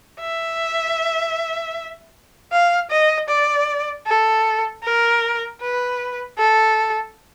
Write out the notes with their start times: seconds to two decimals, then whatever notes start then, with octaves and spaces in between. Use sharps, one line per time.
0.20 E5
2.52 F5
2.91 D#5
3.29 D5
4.07 A4
4.84 A#4
5.61 B4
6.38 A4